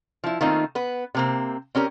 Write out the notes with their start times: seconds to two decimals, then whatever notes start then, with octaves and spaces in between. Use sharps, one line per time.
0.24 F3 E4
0.41 D#3 A3 A#3 C4 D#4 F4
0.75 B3 B4
1.15 C3 A#3 C4
1.75 C4 C#4 G4 A#4